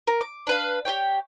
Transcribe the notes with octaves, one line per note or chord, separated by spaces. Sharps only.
A#4
D6
D4 B4 F5
G4 G#4 C#5 G5